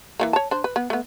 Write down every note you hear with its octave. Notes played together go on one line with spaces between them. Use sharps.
E3 G#3 A#3
C#5 A5
D4 C5
B4
B3
A3 B3